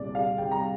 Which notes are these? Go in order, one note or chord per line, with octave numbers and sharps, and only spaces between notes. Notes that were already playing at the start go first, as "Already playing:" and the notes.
Already playing: C2 A#2 D5
G3 F5
C2 G5
A#5